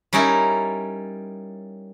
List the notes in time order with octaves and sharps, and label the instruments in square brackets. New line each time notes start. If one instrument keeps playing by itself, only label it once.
[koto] G3 C#4 D#4 E4 A#4